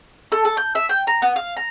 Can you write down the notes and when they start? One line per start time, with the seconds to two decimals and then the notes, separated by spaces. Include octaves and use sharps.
0.32 A4
0.45 A4
0.57 G6
0.75 E5
0.89 G5
1.07 A#5
1.22 B3
1.36 F5
1.57 A#5